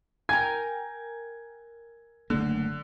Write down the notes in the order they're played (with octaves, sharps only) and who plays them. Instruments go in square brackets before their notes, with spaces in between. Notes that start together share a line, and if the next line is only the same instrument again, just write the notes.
[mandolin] A#4 G5 G#5 [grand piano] G#6
[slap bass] F#1 A3 A#3 [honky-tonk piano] D3